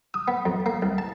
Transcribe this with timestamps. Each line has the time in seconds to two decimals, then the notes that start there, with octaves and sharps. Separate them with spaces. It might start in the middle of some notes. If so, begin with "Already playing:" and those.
0.14 D#6
0.28 B3
0.45 F2
0.66 A#3
0.82 C2
0.98 A5